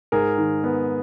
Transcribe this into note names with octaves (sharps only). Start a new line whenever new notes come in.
G#2 G#4 A#4
D#3
B3